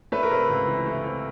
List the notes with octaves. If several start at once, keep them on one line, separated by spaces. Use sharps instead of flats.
A3 B4
A#4
C3 B4
C#2
E3
A3
C3